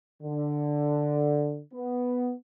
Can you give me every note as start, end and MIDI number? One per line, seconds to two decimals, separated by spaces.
0.22 1.61 50
1.74 2.33 59